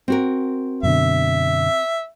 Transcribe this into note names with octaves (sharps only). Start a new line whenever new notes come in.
C4 F#4 A#4
F#2 B2 D3 E5